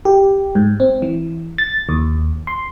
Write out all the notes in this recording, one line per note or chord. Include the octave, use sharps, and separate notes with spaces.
G4
G#2
C4
E3
A6
D#2
C6